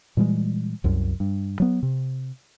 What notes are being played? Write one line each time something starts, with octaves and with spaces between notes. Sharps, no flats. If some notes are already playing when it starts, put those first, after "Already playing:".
A#2 E3 G3 G#3
C2 F#2
G2
F#3 B3
C3